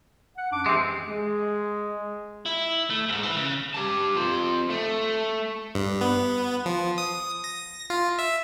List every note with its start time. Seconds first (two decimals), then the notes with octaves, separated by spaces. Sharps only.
0.37 F#5
0.52 F#2 D4 D6
0.66 E3 G#3 C4 G4 E5
1.08 G#3
2.46 E4
2.90 A3
3.09 D#2 G#2
3.23 E4 B4
3.36 C#3
3.74 G4 A5
4.15 F2 C5
4.70 A3
5.75 G2
6.01 B3
6.66 F3
6.98 D#6
7.44 A#6
7.90 F4
8.19 E5